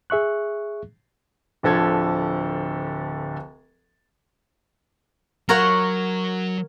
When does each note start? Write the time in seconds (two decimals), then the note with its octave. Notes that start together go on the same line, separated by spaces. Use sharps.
0.10 G#4 E5 C#6 F#6
1.63 D1 D3 F3 A4 G#6
5.49 F#3 A#4 C#5 F#5